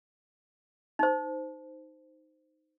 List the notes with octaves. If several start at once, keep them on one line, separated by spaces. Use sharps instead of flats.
D#4 C5